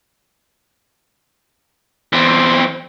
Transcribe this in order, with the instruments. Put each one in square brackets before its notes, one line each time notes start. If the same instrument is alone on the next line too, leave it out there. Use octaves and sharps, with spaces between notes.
[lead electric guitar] E2 C4